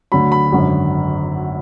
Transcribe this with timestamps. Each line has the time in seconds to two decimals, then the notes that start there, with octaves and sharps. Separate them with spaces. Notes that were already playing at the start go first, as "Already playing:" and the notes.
0.12 D2 D3 F#3 B5
0.32 B5
0.52 G#1 F#2 D3